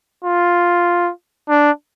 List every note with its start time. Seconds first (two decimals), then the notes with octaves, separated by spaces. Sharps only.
0.25 F4
1.49 D4